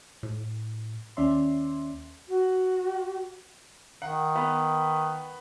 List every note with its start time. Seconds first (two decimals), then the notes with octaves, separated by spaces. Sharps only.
0.23 A2
1.17 D#2 C#4 D5 E5 C6
2.29 F#4
4.02 D#3 F#5
4.36 B3 B4